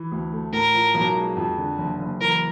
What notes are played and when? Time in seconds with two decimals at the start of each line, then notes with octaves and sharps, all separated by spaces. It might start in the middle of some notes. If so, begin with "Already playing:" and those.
Already playing: E3
0.12 D2
0.32 A3
0.53 A2 A#4
0.74 F3
0.94 B1
1.16 G#3
1.37 F2
1.58 D3
1.78 F#1
1.99 F#1
2.20 E3 A#4